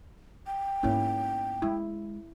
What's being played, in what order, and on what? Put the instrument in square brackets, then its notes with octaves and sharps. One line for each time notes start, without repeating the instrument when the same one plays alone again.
[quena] G5
[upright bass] G#2 B3 [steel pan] A#3 C#4 E4
[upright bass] G#3 [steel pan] E4